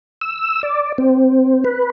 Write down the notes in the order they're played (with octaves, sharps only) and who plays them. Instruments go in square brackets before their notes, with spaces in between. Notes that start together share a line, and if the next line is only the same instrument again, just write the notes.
[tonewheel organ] E6
D5
C4
B4